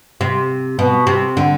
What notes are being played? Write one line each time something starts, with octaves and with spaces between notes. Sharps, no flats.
C3
B2
C3
D3